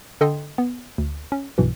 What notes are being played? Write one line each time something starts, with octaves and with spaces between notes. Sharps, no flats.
D3 A4 D#5 G5 C6
B3
D2
C#4
B1 G2 B2 E3